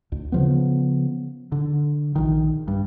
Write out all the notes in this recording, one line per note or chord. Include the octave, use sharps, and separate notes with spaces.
D2
C#3 F3 B3
D3
A#1 D#3
G2